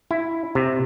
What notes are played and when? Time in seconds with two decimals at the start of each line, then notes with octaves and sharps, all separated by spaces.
0.11 E4
0.55 C3